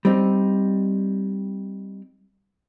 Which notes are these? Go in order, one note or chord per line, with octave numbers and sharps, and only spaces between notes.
G3 C4 D#4